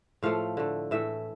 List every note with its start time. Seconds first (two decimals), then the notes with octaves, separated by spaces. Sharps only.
0.23 A2 F3 A3 F5
0.57 D3 A3
0.91 A2 E3 A3 E5